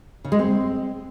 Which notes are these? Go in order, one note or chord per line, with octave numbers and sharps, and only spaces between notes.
C#3
G#3
C4